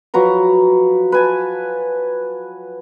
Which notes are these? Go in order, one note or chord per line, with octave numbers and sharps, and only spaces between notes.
F3 F#3 B4 A#5
B4 G#5 A5